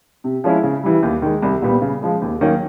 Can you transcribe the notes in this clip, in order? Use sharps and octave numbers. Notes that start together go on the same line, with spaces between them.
C3
F3 G#3 C#4 E4
C#3
E3 G3
D#2
D#3 G#3
C2
A#2 G3 B3
C#3
F3 G#3
D#2
D#3 F#3 A#3 C#4